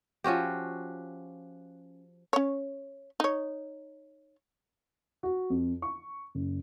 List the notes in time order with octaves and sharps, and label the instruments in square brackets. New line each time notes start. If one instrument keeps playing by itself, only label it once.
[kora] F3 C#4 F#4 G4
[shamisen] C#4 C#5
D#4 C#5
[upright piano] F#4
F2
C#6
F#1